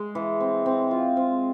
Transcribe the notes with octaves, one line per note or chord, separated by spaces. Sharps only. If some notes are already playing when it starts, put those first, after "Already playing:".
Already playing: G#3
E3
C4
C4
F4
C4